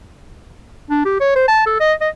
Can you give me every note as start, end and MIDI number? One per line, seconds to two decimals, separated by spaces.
0.90 1.04 62
1.05 1.20 67
1.20 1.34 73
1.36 1.43 72
1.48 1.62 81
1.66 1.76 69
1.80 1.93 75
2.01 2.09 75